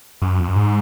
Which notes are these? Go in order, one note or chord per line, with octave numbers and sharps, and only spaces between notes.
F#2
F2
F#2
G#2